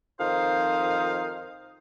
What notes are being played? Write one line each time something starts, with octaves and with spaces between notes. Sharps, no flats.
F2 D#3 F3 D#4 C5 F5